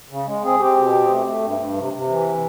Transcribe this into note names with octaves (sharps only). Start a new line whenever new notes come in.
C#3
G#3
C4 G#4
C4 G4
B2
C4
A3
A3
G2
G2
C3
C3
E3